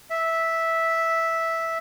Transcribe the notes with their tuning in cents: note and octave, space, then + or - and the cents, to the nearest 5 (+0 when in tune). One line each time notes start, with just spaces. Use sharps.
E5 -5